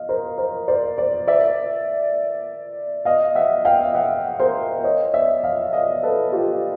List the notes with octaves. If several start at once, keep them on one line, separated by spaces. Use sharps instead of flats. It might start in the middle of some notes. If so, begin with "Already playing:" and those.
Already playing: D#5 F5
A#4 C5
A#4 C5
C5 D5
C5 D5
D5 E5
D#5 F5
E5 F#5
F5 G5
E5 F#5
A#4 C5
C#5 D#5
D5 E5
D#5 F5
D#5 F5
A4 B4
F4 G4